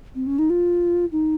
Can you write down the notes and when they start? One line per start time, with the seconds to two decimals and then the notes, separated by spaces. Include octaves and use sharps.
0.15 C4
0.27 C#4
0.39 D#4
0.50 F4
1.12 D#4